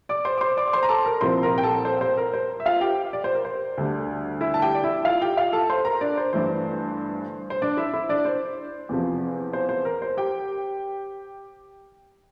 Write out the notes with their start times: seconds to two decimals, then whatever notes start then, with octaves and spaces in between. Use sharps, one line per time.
0.09 D5 D6
0.25 C5 C6
0.38 D6
0.41 C5 C6
0.57 D5 D6
0.68 D6
0.73 C5 C6
0.83 A#5
0.89 A4 A5
1.05 A#4 A#5
1.21 C2 A#2 F3 C4 E4 C5 C6
1.43 A#4 A#5
1.58 G5
1.64 A4 A5
1.85 C5
2.01 C5
2.17 A#4
2.34 C5
2.60 E5
2.66 F4 F5
2.81 G4 G5
3.13 D5
3.24 C5
3.35 A#4
3.45 C5
3.78 D2 D3 G3 D4
4.41 E4 E5
4.54 A5
4.62 G4 G5
4.75 D5
4.84 E4 E5
5.05 F4 F5
5.22 G4 G5
5.37 F4 F5
5.53 A4 A5
5.70 C5 C6
5.85 A#4 A#5
6.01 D4 D5
6.17 C5
6.33 G1 G2 E3 A3 C5
7.50 C5
7.62 D4 D5
7.77 E4 E5
7.93 E4 E5
8.09 D4 D5
8.25 C5
8.89 E2 C3 F3
9.53 C5
9.69 C5
9.85 A#4
10.02 C5
10.17 G4 G5